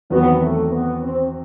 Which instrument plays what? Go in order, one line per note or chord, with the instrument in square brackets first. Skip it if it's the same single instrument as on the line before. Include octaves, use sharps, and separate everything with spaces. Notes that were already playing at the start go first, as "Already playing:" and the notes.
[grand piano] E2 D#3 F#3 C4 F#4 [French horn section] B3
[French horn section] A3
B3
C4